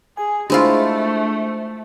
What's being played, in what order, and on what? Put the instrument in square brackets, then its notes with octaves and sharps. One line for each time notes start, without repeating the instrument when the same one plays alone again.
[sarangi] G#4 [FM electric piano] G#5
[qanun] G#3 E4 F4 [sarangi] A3 [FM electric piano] D4 C5